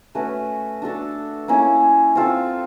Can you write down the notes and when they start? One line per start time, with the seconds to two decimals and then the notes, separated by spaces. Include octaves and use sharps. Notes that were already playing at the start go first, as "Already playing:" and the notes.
0.15 A3 C#4 F#4 B4
0.82 D4 F#4 A4 D5
1.48 A#3 C#4 E4
2.15 C4 F4 A4